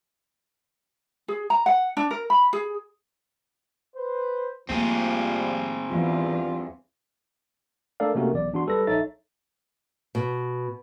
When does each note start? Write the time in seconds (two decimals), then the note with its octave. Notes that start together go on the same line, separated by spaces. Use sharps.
1.28 G#4
1.50 A#5
1.66 F#5
1.97 D4
2.11 A#4
2.30 B5
2.53 G#4
3.95 B4 C5
4.69 F3 G3 A3 A#3 C4 G#4
5.89 E2 G3 D4 F4
8.00 A3 D4 A4 A#4 D5 F5
8.15 C3 A3 A#3 C#4 F#4 A#4
8.32 B1 E2 D5
8.53 E2 D4 F#4 C6
8.67 G3 A4 B4 A#6
8.87 A#1 D#4 A4 C#5 E5 A6
10.15 B2